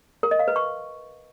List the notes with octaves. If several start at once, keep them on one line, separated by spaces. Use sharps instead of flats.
A#4
D#5
F5
B4
C#6